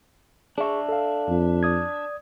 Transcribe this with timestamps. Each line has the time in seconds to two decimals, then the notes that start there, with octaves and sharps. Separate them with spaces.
0.58 D4 G#4 E5 C#6
0.89 A4 F5
1.28 F2
1.63 D5 D#6 G#6